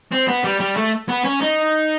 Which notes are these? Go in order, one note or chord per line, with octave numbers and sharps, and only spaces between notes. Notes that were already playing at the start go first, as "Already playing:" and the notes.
C4
B3
G3
G3
A3
B3
C#4
D#4